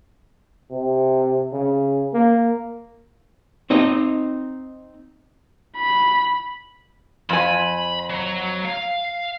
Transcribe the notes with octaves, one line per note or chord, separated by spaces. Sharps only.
C3
C#3
A#3
C4 D#4 D#5
B5
F2 G#5 B5
F#3 A#5
F5